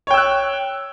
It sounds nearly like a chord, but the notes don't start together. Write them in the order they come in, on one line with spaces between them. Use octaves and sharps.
C#5 G5 E6 F#6